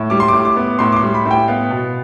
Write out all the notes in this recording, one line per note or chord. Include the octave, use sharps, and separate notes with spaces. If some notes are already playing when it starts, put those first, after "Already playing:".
Already playing: A2
G3 D6
C6
A2 D6
D6
B3
A2 C6
D6
C6
G3
B5
A2
G5
B3 F5
B2